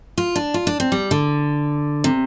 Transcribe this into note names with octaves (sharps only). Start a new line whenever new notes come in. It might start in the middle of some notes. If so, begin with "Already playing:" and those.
F4
D4
F4
D4
C4
G3
D3
C3